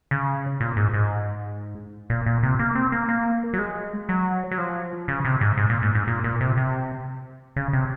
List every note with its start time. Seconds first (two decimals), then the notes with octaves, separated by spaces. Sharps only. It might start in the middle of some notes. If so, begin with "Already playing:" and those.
0.11 C#3
0.60 A#2
0.77 G#2
0.94 G#2
2.10 A#2
2.26 A#2
2.43 C3
2.59 A#3
2.75 C4
2.92 A#3
3.09 A#3
3.54 F#3
3.58 G#3
4.09 F#3
4.51 F#3
4.58 F3
5.08 C#3
5.25 C3
5.41 G#2
5.57 G#2
5.70 A#2
5.82 G#2
5.95 G#2
6.07 A#2
6.24 A#2
6.41 C3
6.57 C3
7.56 C#3
7.73 C3